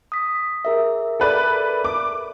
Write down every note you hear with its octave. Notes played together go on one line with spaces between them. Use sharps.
D#6 B6
G#4 A#4 E5
A4 B4 D5
D6